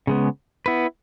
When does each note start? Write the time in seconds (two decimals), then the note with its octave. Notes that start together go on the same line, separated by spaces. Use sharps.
0.07 C#3 G#3 B3
0.66 B3 E4 B4